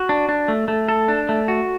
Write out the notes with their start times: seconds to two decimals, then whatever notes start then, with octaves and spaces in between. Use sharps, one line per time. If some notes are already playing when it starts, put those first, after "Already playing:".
Already playing: F#4
0.09 D4
0.29 D4
0.48 A3
0.68 A3
0.89 A4
1.08 D4
1.29 A3
1.48 F#4